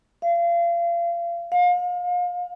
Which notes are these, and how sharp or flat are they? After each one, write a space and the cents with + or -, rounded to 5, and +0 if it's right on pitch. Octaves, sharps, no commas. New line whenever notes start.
F5 -35
F5 +35